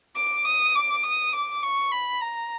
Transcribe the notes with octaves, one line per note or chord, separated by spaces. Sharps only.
D6
D#6
D6
D#6
D6
C#6
B5
A#5